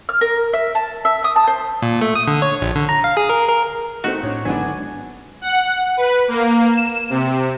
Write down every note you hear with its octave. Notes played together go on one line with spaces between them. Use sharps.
F6
A#4
E5
A5
E5
D#6
A5
C5
A#2
A3
D#6
D3
C#5
A#1
D3
A#5
F5
G#4
A#4
A#4
A3 C4 D#4 F#4
A2 D4 C#5
G#1 G#2 D3 F#3 B3 D4 G#5
F#5
B4
A#3
E7
C3